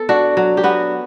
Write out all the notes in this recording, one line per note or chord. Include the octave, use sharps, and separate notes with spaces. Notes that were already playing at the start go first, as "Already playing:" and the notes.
Already playing: B3 A4
D4 F#4
F#3
G4
B3 F#4